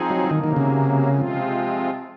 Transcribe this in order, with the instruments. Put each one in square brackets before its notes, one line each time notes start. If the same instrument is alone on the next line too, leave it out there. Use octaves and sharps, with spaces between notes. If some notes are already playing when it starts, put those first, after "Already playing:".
Already playing: [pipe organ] F3 C4 D#4 G#4
[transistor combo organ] F#3
[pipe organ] C3 F#3 A#3 [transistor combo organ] D#3
[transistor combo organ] D#3
C#3
[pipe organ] C3 F3 G#3 C4 F4